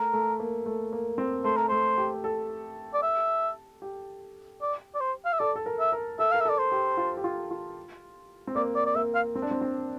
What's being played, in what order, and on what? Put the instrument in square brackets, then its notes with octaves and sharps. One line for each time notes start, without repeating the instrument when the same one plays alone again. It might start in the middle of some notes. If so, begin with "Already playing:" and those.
Already playing: [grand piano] A3 [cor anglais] A#4
[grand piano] A3
A#3
A3
A#3
C4
[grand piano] A3 [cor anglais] C5
[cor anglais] A#4
[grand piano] A3 [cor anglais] C5
[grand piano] G4
A4
[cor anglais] D5
E5
[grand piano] G4
[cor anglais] D5
D5
C5
F5
E5
[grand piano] A4 [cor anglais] D5
[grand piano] A4
A#4
[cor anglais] E5
[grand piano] A#4
[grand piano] A4 [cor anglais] E5
[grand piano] A#4 [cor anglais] F5
[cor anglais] E5
[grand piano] A4 [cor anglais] D5
[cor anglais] C5
[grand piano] G4
F4
G4
F4
F4
C4
[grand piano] A#3 [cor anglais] D5
[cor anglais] D5
D5
[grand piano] A#3 [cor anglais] E5
[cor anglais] F5
[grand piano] C4
D4
C4
C4